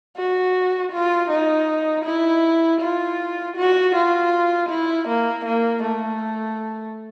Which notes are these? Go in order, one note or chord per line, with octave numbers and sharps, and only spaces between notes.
F#4
F4
D#4
E4
F4
F#4
F4
E4
A#3
A#3
A3